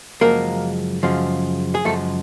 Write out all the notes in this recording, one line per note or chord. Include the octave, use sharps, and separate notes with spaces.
F#2 C#3 F3 G#3 A#3 A#4
F#2 C#3 F3 G#3
G#4
F#2 C#3 F3 G#3 A3 A4